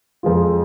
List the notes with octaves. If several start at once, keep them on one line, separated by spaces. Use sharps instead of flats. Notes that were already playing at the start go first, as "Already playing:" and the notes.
F2 F3 G#3 F4